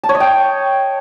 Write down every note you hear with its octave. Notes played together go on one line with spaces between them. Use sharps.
A5
C#5
D#5
G5